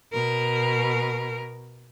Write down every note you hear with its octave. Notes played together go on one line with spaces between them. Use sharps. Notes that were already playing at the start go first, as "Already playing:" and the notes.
B2 A#4